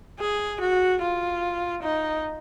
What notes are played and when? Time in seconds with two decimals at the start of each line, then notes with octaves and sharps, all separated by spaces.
0.20 G#4
0.61 F#4
1.02 F4
1.83 D#4